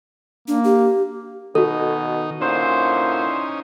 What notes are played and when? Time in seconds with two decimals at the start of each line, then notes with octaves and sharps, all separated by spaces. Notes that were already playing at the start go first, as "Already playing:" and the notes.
0.48 A#3 D4
0.64 G4
1.55 B2 D#3 D#4 F#4 A4
2.41 A#2 D3 C#4 D#4 E4 C5